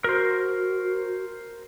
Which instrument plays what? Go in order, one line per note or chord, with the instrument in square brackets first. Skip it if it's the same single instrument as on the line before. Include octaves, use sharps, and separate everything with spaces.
[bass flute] F#4 [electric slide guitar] A#4 C5